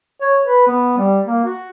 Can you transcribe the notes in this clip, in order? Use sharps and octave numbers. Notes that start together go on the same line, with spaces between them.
C#5
B4
B3
G3
A#3
F#4